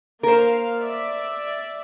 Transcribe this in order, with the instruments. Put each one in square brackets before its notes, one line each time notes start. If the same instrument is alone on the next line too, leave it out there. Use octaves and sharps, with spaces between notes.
[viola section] A#3 F5 [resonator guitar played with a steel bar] A#4 C5
[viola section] D5 E5